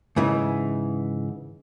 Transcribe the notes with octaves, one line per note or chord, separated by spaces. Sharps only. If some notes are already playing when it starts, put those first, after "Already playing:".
G#2 C#3 E3